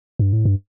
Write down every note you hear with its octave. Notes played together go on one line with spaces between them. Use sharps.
G2
A2
G2